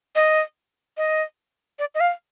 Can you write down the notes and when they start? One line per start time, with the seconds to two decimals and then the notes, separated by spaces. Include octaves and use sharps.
0.15 D#5
0.97 D#5
1.79 D5
1.95 D#5
2.00 F5